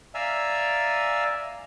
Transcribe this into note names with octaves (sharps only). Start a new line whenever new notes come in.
D5 E5 F5 G#5 A#5 E6